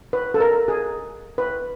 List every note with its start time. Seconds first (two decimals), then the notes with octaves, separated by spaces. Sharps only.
0.13 B4
0.34 A4
0.40 A#4
0.68 G#4
1.38 B4